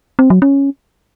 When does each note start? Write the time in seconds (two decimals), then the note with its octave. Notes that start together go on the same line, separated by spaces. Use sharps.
0.19 C4
0.30 F#3
0.42 C#4